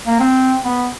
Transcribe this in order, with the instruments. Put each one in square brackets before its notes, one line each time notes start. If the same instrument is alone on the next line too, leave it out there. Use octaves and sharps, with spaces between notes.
[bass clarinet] A#3
C4
B3